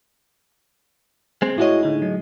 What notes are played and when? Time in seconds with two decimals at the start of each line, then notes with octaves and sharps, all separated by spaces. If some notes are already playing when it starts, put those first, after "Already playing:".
1.42 G#3 C4
1.58 A2 G#3 E4 F#4 C#5 D#5
1.83 D3 D#4
2.02 F#3